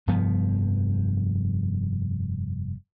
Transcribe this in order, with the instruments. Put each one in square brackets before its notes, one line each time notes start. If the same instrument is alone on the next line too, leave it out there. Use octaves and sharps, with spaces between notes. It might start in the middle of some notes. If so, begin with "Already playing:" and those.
[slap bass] F1 G2 F3 B3